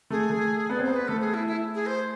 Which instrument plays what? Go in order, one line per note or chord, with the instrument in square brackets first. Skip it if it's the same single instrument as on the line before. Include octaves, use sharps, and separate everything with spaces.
[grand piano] A3 [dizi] G#4
[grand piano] A3
[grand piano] B3 [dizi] D5
[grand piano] C4
[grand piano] B3 [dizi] C5
[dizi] B4
[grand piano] A3 [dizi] A4
[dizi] G#4
E4
E4
G#4
C5